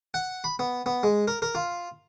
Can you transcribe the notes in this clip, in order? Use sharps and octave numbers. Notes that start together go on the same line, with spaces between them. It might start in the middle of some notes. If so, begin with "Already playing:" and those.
F#5
B5
B3
B3
G#3
A#4
A#4
F4